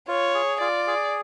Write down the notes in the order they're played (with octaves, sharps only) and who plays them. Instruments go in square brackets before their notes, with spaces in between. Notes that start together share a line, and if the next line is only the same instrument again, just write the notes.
[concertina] F4 [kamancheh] C#5
[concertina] G#4
[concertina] F4 [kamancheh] D5
[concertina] G#4